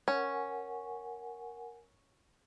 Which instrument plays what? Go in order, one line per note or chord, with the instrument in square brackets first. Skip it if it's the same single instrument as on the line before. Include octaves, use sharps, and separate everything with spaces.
[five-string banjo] C#4 [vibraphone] A#4 F#5 G#5